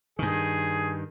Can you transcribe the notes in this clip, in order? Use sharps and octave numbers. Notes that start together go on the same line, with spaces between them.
G2 D#3 G#4